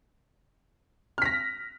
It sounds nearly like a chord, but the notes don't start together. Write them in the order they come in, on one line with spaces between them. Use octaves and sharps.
F6 B6 A#6